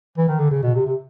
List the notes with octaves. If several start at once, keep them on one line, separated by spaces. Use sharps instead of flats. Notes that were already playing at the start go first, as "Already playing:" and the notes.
E3
D#3
D3
C#3
B2
C3
C3